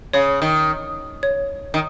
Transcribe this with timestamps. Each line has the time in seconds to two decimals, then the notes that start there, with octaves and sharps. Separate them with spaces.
0.13 C#3 C#5
0.42 D#3
1.23 C#5
1.74 D#3